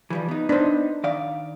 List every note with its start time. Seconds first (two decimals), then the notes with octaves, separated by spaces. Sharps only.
0.10 E3 F3 G3
0.29 B3 D#4
0.49 B3 D4 D#4 C5
1.04 D#3 D5 F5